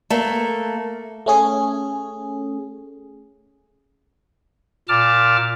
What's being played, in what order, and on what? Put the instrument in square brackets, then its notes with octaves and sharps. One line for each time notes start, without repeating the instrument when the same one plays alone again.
[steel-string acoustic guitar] A3 A#3
[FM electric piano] A3 C#4 G#4
[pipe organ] A#2 A5 D6 F6